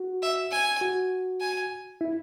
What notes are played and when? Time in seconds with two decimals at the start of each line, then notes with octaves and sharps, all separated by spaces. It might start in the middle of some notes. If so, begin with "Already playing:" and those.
Already playing: F#4
0.22 E5
0.51 G#5
0.81 F#4
1.41 G#5
2.01 E4